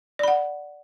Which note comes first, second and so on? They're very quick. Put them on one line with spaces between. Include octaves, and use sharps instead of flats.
D5 B5 F#5